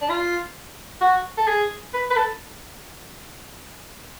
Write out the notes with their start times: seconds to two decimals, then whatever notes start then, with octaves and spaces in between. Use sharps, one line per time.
0.01 D4
0.09 F4
1.01 F#4
1.37 A4
1.48 G#4
1.94 B4
2.11 B4
2.16 A4